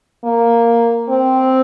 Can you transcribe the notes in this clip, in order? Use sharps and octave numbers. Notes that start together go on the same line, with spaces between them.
A#3
C4